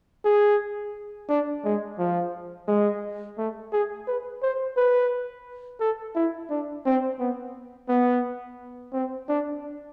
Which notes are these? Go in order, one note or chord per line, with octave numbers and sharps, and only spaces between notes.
G#4
D4
G#3
F3
G#3
A3
G#4
B4
C5
B4
A4
E4
D4
C4
B3
B3
C4
D4